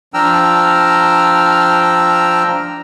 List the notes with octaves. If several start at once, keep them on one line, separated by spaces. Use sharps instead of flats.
F3 D4 G5 A#5 E6 F6